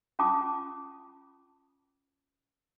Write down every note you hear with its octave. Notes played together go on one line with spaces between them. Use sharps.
C#4 F4 A5 D6 D#6